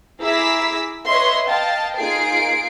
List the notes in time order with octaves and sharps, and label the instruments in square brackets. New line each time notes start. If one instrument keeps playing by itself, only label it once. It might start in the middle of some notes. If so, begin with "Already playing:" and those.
[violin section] E4 G#4 A#5 D6 E6 B6
B4 C#5 D#5 E5 C6
D#5 F5 G5 A5
A#3 D#4 F4 G#4 C7 D7